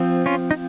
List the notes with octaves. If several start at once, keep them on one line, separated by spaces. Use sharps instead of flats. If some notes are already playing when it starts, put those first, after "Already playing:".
Already playing: F3 C4
C#4 F4
D#4